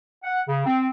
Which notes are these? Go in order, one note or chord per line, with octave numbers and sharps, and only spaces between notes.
F#5
C#3
C4